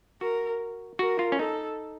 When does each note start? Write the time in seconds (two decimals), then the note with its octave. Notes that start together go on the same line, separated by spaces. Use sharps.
0.21 F#4 A#4
0.99 F#4 A#4
1.19 F4
1.32 C#4
1.38 D#4 A4